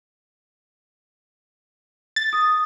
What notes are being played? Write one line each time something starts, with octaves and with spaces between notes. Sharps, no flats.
A6
D#6